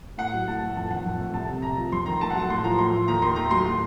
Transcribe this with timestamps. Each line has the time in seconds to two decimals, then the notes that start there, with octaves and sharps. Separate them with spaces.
0.18 A2 F#5
0.33 F#3
0.47 A2 A5
0.62 A3
0.76 F2 A5
0.91 D#3 F#5
1.06 F2
1.19 A3
1.34 C2 A5
1.49 C3
1.62 C2 A#5
1.77 F3
1.92 F2 C6
2.06 D#3 A#5
2.21 A3 A5
2.30 F#5
2.35 F#3 A5
2.50 A2 C6
2.64 F3 A#5
2.79 A2 C6
2.93 A3
3.08 D#2 A#5
3.22 D#3 C6
3.36 A3 A#5
3.51 F#3 C6
3.66 A2